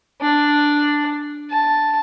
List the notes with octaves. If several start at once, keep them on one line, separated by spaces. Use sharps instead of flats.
D4
A5